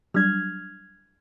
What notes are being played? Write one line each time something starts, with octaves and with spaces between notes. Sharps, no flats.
F#3 G3 D4 F6 G#6